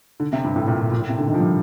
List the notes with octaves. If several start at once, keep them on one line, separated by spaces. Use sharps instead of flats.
D3
C3
G2
A2
A#2
A#2
A#2
A2
C3
D3
D#3
F3
G3